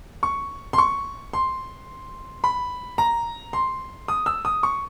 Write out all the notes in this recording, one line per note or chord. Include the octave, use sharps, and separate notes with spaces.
C#6
C6
C#6
C6
B5
A#5
C6
D#6
E6
D#6
C#6